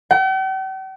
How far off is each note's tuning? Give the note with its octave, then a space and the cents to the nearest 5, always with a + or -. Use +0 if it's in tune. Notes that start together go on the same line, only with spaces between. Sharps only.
G5 -45